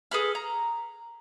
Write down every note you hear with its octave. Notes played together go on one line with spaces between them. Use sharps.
G#4 A4 B4 F6
A#5